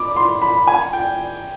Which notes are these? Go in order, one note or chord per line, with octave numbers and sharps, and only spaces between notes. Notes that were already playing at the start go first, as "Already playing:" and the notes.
Already playing: B5 D6
C6
B5
G#5
G5